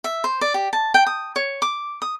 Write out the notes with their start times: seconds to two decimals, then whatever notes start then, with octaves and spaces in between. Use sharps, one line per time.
0.04 E5
0.24 C5
0.41 D5
0.54 G4
0.73 A5
0.94 G5
1.06 D#6
1.36 C#5
1.62 D6
2.02 D#6